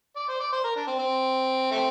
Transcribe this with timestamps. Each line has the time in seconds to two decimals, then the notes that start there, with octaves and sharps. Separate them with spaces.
0.16 D5
0.28 C5
0.40 D5
0.52 C5
0.64 A#4
0.76 D4
0.87 C4
0.99 C4
1.71 A3 C4